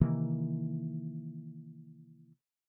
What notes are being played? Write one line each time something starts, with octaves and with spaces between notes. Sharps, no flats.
C3 D#3 E3 A#3